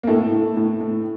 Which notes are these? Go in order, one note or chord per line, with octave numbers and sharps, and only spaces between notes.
A#3
A2 A3
A2
A2
A2